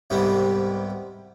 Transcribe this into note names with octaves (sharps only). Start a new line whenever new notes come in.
C2 G#2 C3 G3 B3